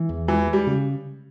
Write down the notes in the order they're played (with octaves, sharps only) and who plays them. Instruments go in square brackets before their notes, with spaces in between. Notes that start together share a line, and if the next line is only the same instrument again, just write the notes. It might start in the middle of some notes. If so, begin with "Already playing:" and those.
Already playing: [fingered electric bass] E3
E2
[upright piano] E3 [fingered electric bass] G#3
[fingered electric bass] G#3
[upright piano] G3
[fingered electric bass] C#3